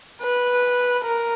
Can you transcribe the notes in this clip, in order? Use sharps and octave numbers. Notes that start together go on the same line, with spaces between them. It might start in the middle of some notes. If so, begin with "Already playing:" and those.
B4
A#4